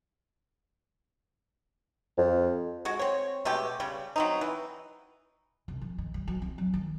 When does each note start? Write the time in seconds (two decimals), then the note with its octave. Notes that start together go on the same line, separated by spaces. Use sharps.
2.18 F2
2.85 G#3 F#4
2.99 C4 C#5
3.45 B2 G#3 A3 G4
3.80 C#3 G3
4.16 F#3 C4 D#4
4.41 E3
5.68 C2
5.82 F3
5.98 D#3
6.14 G3
6.28 F#3
6.42 C4
6.58 F#3
6.74 D#3